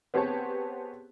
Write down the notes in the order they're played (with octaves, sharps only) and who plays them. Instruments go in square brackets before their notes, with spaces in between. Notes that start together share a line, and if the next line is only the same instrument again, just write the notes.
[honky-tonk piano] B3 C4 G4 G#4 C#5 A5